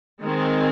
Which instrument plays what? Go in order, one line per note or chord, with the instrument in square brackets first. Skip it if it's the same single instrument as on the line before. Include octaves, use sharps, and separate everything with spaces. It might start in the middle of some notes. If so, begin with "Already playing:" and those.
[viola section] D#3 G#3 C4